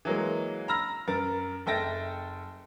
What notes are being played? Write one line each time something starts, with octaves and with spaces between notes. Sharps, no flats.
E3 F#3 G#3 A#3
A#5 B5 E6 F6 A#6
F#2 A#4 A6
F#1 A4 E5 G5 A6 A#6